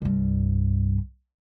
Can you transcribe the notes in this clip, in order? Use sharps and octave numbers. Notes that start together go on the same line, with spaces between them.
C2 G2